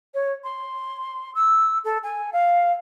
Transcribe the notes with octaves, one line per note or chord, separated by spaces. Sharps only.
C#5
C6
E6
A4
G#5
F5